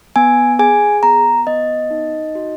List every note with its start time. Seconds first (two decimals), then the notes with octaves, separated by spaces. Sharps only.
0.16 B3 G#5
0.59 G#4 G#5
1.03 B3 A#5
1.47 B3 D#5
1.91 D#4
2.35 F#4